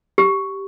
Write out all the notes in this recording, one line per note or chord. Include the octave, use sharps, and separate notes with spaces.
G4